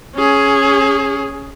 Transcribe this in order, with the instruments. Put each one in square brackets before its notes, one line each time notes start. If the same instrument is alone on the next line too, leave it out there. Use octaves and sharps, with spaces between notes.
[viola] C#4 G#4